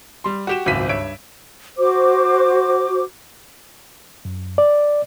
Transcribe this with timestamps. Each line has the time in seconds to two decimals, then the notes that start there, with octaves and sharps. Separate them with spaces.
0.24 G3 C6
0.47 F#4 G4 E7
0.66 G#1 C#2 F#2 C4 B6 D#7
0.89 G2 C#5 E5 D7
1.78 F#4 C5 D6
4.25 F#2
4.58 D5